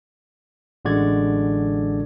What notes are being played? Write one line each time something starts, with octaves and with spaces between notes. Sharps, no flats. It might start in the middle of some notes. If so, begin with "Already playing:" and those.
A1 D3 G#3 F#4 D5 G#6